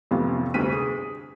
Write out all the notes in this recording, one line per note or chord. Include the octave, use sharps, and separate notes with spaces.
A1 F2 C3 B3 F4
G1 D2 C3 B6 D#7
G#4